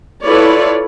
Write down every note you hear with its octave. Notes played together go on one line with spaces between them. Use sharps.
E4 F4 A4 B4 C#5 D5